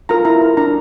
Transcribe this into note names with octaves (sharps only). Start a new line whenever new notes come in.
F4 A#4 A#5
E4 A#5
A#4
D4 A#5